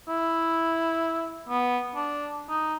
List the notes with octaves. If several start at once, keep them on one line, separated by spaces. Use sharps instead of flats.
E4
B3
D4
D#4